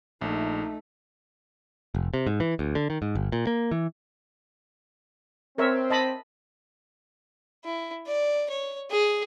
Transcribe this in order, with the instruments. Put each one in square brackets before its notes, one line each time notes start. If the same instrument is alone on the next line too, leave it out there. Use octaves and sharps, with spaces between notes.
[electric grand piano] A#1 [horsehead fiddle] A3 D#4
[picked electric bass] F1
C3
G#2
E3
D2
D3
D#3
G#2
G1
A#2
A#3
E3
[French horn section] C4 [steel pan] A#4 C#5 E5
[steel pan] D#5 A5 B5
[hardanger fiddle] E4
D5
C#5
G#4